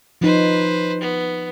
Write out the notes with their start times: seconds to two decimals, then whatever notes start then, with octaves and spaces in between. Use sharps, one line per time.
0.21 F3 D#4 B4 C5
1.00 B3